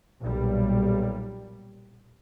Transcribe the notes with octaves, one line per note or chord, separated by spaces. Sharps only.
B1 A#2 G3